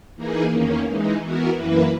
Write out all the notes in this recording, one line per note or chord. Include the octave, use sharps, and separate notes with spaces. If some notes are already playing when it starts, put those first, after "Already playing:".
E3 A#3 D#4 G#4
E2 D#3 A#3 C#4
E3 G#3 D#4
E3 B3 F#4 A#4
F#2 E3 A#3 E4 B4